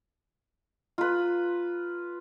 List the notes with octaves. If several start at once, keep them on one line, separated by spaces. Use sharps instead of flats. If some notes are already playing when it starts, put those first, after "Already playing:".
F4 B4